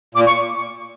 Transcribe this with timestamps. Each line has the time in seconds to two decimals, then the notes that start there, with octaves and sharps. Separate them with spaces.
0.15 A#2 D6
0.26 C#6